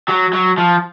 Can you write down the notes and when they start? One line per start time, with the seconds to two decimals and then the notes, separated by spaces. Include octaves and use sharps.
0.08 F#3
0.33 F#3
0.58 F3